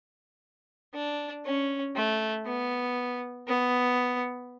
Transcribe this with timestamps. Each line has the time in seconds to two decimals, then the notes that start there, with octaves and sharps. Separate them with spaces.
0.94 D4
1.45 C#4
1.95 A3
2.46 B3
3.47 B3